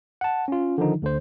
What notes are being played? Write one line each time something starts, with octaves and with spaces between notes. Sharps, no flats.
F#5 A5
C#4 F4
D3 D#3 F3 D#4
D2 D3 C5